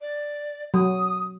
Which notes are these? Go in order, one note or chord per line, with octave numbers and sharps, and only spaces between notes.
D5
F#3 D#6